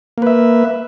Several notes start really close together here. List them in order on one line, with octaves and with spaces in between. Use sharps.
A#3 B4 E5